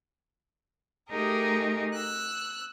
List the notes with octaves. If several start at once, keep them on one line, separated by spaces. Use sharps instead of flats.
A3 D#4 G4 G#4 A#4
E6 F#6